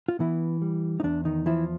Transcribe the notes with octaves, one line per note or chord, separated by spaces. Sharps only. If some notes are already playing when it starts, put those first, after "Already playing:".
F4
E3 B3 E4
G3
D#4
E2 D4
D#3 D#4
E3 F3 E4